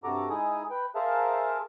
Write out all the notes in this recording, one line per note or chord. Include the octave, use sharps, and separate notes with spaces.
G2 C3 F#4 A4 A#5 D6
G#3 D#4 E4 G#4 G#5 D#6
B4 G5
G#4 A#4 C5 E5 F5 A5